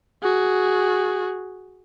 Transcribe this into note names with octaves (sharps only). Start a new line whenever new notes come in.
F#4 G#4